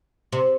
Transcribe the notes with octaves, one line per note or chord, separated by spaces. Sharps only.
C3